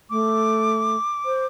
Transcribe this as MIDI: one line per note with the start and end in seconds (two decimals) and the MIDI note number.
0.10 0.96 57
0.10 1.47 86
1.25 1.46 72